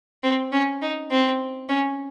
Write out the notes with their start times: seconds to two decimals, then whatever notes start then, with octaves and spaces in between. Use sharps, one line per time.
0.23 C4
0.52 C#4
0.82 D#4
1.11 C4
1.69 C#4